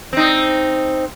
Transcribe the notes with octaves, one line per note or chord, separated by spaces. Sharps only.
C4 D#4